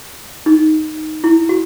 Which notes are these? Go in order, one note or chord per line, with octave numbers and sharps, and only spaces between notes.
D#4
E4
F#4